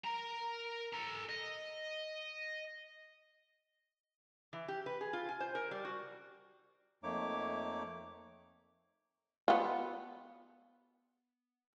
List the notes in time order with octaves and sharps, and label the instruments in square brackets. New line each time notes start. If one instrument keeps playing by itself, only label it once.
[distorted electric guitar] A#4 A#5
A4 A#5
D#5
[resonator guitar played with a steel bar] E3
G4
B4
G#4
F4
G#5
C5
A#4
G3
F#4
[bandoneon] F2 A3 A#3 D#4 C#5 D6
[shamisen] B3 F4